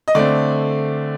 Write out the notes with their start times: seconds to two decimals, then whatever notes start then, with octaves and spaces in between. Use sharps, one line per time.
0.08 D#5
0.15 D3 A3 C4 D5